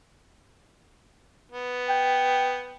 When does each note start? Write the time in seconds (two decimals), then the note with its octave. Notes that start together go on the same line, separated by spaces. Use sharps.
1.52 B3
1.89 G5